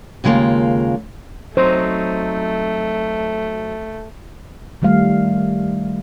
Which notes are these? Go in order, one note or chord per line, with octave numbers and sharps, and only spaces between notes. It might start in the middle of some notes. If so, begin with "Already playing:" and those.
D#2 C#3 G#3 A#3 F4
F#3 A3 C4 D#4 C5
D#3 G3 A3 F5